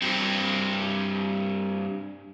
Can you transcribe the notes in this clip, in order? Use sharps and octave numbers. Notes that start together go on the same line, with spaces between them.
G2 C4